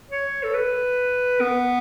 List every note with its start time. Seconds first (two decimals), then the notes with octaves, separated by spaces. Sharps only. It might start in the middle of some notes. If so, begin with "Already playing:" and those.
0.10 C#5
0.43 A4
0.54 B4
1.41 B3